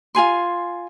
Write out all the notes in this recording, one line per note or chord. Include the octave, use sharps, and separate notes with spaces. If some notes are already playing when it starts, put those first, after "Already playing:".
F4 G#4 G#5 C6